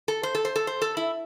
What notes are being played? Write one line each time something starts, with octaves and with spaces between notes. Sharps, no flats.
A4
C5
A4
C5
A4
C5
A4
E4